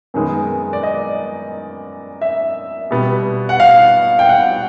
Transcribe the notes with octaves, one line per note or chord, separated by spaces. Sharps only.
F#2 D#3 G#3 B3
D5
D#5
E5
B2 G3 B3
F#5
F5
G5
F#5